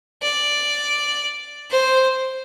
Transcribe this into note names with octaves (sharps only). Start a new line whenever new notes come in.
D5
C5